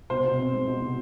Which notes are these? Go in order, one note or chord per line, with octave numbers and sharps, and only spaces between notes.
B2 C5
B2
C4
G#3
B2
B2